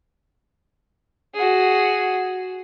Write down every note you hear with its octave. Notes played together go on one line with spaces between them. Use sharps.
F#4 G#4